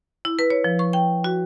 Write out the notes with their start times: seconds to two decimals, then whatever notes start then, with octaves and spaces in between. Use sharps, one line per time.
0.25 E4
0.39 B4
0.50 C#5
0.64 F3
0.79 C#6
0.93 G5
1.24 F#4